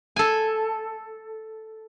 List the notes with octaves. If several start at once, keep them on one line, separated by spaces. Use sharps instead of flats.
A4 G#5